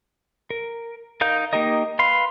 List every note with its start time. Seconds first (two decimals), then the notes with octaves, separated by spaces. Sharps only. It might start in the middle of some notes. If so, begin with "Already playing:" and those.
0.50 A#4
1.21 D#4 A#4 F5 G6
1.53 A#3 D#4 G4 A#4 D#5
1.99 B4 F5 C6